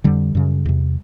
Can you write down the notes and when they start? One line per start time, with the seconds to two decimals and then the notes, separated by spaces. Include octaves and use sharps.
0.04 F2 D3 G3
0.35 F#2 C#3
0.65 E2 C3